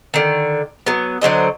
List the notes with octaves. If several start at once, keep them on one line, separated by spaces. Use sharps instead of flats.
D3 D#3
F#3 B3
D3 F#3 C5 D#5